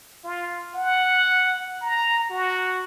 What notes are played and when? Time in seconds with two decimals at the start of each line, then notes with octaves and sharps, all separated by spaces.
0.24 F4
0.75 F#5
1.82 A#5
2.30 F#4